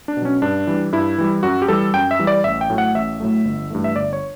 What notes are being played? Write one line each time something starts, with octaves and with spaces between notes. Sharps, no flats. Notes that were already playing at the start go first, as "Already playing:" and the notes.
D4
B2
F#3 C#4
G2 D4
E3 G3
G2 E4
E3 G3
F#2 F#4
G4
E3 G3 A4
F#2 G5
E5
E3 G3
D5
A1 E5
G5
A2 F#3 A3
F#5
A1 E5
A2 F#3 A3
G1
G2 E3 A3
E5
G1 D5
C#5